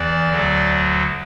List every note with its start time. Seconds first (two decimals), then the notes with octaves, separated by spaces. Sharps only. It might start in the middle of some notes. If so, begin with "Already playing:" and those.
Already playing: E2 E3 D5
0.29 D2 D3 F#3